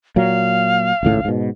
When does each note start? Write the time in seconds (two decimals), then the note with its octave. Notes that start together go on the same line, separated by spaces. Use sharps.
0.16 A#2 F#3 F5
1.03 G#1 C#2 A2
1.25 G#2 B2